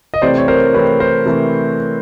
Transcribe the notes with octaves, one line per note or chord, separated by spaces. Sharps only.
D#5
C3 E3 A3 C4 C5 D5
C#5
A#4 C5
C3 E3 A3 C4 B4 C#5
A#4 C5
C3 E3 A3